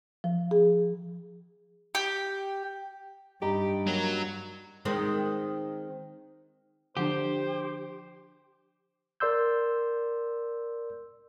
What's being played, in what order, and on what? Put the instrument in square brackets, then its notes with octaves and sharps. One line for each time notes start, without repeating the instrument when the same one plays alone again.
[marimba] F3
G#4
[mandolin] G4
[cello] G2 [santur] D#4 A#5 B5 [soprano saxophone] G4
[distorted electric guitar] F#3 [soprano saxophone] A#3
[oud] D#3 G#3 C4
[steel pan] D3 F3 D4 [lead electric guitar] G4 [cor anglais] C5
[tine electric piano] A#4 D5 C6 E6 G6